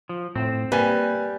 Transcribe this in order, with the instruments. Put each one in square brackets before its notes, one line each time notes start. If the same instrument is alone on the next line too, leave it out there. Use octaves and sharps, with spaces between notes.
[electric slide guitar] F3
[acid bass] A2 [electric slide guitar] C4
[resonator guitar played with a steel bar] G3 [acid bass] A#3 [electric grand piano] B4 G#5